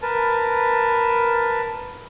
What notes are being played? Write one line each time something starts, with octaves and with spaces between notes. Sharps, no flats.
A#4 B4 A5